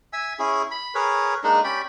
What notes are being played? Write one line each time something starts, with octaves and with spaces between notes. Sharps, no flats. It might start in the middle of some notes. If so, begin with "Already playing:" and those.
E5 G#5 E6
C#4 E4 G#4
B5
G#4 A#4 B4 C#5
G#3 A#3 D4 D#4
C#4 G4 D5 B5